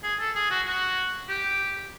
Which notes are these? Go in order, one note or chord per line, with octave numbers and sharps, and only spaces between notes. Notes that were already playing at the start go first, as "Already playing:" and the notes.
G#4
A4
G#4
F#4
F#4
G4